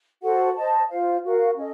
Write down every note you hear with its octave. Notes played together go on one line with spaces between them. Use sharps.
F#4 A4 C5 F#5
C5 D#5 A5
F4 C5 F5
F#4 A#4 F5
C#4 A4 D#5